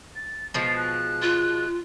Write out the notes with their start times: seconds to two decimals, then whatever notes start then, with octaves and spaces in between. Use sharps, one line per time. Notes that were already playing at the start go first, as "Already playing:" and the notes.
0.16 A6
0.54 B2 F3 G#3 C7
0.77 F#6
1.22 F4